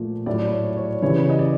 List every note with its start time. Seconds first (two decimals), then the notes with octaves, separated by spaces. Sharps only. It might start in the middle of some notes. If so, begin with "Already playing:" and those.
Already playing: A#2 F3 A3
0.26 A2 F#3 A3 D5
0.52 C#5
0.77 C#5
1.02 C#3 E3 G3 C#5
1.30 D#5
1.39 D5